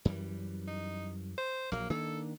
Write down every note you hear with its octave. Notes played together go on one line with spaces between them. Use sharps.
F#2 E3 G3
D#4
C5
A#1 F#3 A#3
D#3 A#3 D4 A4